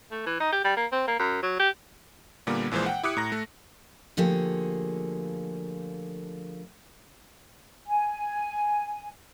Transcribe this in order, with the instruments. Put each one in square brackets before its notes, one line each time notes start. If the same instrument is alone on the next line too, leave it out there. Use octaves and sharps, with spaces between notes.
[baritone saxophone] A3
E3
D#4
G4
G3
A#3
C4
A#3
F#2
F#3
G4
[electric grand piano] A#2 D3 G3 A#3 B3
A#1 A#2 E3 G#3 C5
F#5 G5
E4 G4 D6 D#6 F#6 C#7
A2 A#5 A#6
A3
[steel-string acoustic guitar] D3 F3 A3 A#3 G4 G#4
[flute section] G#5